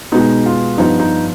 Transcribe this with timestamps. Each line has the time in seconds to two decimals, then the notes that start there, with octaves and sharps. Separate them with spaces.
0.12 B2 G#3 B3 D#4
0.46 F4
0.78 G2 F3 B3 D#4
1.00 D#4